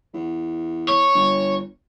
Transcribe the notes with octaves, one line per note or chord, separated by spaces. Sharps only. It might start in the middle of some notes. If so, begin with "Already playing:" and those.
E2
C#5
G1